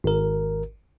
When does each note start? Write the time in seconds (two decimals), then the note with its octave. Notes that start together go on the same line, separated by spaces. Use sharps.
0.04 G#1 A#4